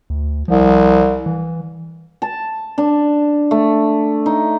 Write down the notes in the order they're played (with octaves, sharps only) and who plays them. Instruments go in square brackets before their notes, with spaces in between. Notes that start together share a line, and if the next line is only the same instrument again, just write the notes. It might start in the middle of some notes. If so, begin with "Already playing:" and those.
[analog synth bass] D2
[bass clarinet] C2 [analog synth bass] F3
[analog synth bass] E3
[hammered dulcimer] A5
D4
A3
D#4